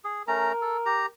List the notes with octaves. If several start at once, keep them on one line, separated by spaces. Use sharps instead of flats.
G#4
A3 C#4 A#4 A#5
A4
G4 A#5